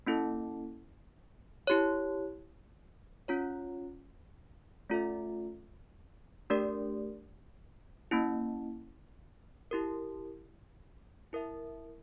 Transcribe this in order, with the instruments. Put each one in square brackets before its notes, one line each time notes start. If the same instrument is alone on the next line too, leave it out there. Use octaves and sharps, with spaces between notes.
[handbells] A#3 C#4 E4 A4
E4 G4 C#5
C#4 F4 C#5
A3 C#4 F4 A4 E5
A3 D4 G4 A#4 D5
A#3 C#4 E4
E4 G4 A#4
E4 A#4 E5